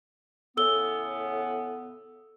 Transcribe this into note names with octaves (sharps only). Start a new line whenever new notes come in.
A2 C#3 B3 A4 E6 G7